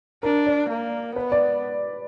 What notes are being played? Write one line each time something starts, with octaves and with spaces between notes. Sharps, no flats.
D4 A#4
D5
A#3
B3 B4
D5